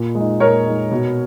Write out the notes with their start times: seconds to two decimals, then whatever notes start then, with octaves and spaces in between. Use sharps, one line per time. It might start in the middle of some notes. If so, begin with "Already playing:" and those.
Already playing: A#2
0.15 G#3 D#4
0.40 A#2 A#4 C#5
0.66 G#3 D#4
0.92 B2